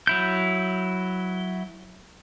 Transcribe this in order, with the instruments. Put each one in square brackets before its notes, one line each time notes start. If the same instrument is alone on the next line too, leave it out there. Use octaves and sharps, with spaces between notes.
[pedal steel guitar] F#3 E4 G6